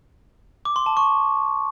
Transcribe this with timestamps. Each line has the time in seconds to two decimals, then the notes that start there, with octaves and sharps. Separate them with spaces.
0.65 D6
0.76 C6
0.86 A5
0.97 C#6